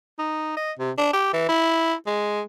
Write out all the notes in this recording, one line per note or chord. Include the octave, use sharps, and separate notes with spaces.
D#4
D#5
C3
D4
G4
E3
E4
G#3